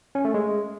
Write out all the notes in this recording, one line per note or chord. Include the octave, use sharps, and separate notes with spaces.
C#4
A3
G#3